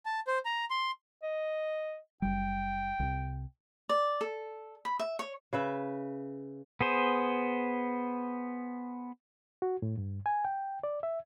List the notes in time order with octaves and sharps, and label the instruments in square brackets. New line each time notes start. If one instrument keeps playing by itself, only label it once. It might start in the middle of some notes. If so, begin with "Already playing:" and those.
[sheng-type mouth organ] A5
C5
A#5
C6
[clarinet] D#5
[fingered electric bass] F#1 G3 [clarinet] G5
[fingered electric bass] C2 C3
[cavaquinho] D5
A4
B5
E5
C#5
[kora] C#3 B4 E5
[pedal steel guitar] B3 G#4 C5
[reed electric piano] F#4
A2
G2
G#5
G5
D5
E5